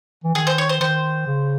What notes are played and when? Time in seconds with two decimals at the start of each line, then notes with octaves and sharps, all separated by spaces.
0.24 E3
0.35 D#3 G#4
0.47 C5
0.58 C#5
0.69 C5
0.80 D#3 C5
1.26 C#3